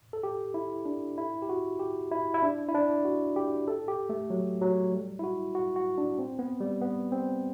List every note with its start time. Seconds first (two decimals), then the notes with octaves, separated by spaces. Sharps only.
0.13 A4
0.23 G4
0.54 E4
0.85 D4
1.18 E4
1.42 G4
1.49 F#4
1.79 G4
2.11 E4
2.34 E4
2.43 D4
2.69 E4
2.74 D4
3.05 F#4
3.36 G4
3.68 A4
3.88 G4
4.09 A3
4.30 F#3
4.61 F#3
4.92 G3
5.19 E4
5.24 F#4
5.55 F#4
5.76 F#4
5.98 D4
6.19 C4
6.39 B3
6.60 G3
6.81 B3
7.12 C4